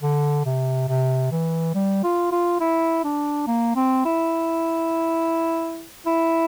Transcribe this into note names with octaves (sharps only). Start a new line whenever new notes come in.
D3
C3
C3
E3
G3
F4
F4
E4
D4
A#3
C4
E4
E4